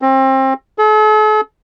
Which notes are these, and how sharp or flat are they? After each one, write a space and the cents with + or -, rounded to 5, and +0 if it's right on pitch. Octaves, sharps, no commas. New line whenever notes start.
C4 +30
A4 -45